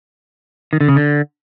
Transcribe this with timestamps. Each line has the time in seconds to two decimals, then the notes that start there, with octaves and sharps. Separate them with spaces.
0.73 D#3
0.81 D3
0.88 C#3
0.96 D3